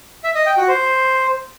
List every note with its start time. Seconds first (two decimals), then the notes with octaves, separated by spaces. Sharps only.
0.24 E5
0.35 D#5
0.46 G5
0.57 F#4
0.68 C5